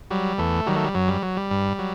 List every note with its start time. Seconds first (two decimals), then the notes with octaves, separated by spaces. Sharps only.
0.11 F#3 G3
0.38 E2 A3
0.66 D#3 F#3 G3
0.76 A3
0.84 G3
0.94 F#2 F#3
1.08 G3
1.22 F#3
1.37 G3
1.51 G2
1.79 F#3